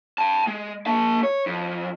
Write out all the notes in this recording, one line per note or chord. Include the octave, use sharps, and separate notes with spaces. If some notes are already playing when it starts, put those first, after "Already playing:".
G5 A5
G#3
A#3 A5
C#5
F2